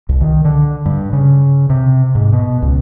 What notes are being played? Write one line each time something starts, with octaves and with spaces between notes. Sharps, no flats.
C2
D#3
D3
G2
C#3
C3
G#2
B2
C#2